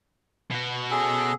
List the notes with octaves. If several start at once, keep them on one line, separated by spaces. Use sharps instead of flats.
B2 F#4
C#4 G#4 A4